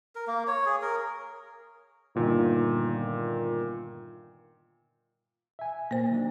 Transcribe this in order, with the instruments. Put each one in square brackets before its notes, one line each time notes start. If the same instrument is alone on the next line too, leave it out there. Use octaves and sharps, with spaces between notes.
[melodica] A#4
A#3
C#5
G#4
A#4
[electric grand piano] G1 A#2 D#3
[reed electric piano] E5 G#5
[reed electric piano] A#2 [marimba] A#3 C5
[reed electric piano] D#3 F#3 D4